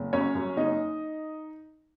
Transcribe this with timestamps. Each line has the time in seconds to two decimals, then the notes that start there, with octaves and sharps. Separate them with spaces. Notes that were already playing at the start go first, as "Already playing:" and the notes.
Already playing: F#1
0.13 F#2 C#4 C#5
0.35 F#2
0.56 F#1 D#4 D#5